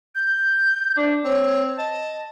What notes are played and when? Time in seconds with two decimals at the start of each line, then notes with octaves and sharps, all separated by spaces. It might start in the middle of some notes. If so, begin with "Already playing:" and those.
0.15 G6
0.97 D4
1.24 C4 C#5
1.78 D#5 A5